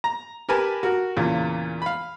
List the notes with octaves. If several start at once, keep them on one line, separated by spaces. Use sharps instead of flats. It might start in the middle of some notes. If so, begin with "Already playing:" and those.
A#5
G4 A#4 B4 G#5 A5
F#4 A#4
E2 A#2 C#3
F5 B5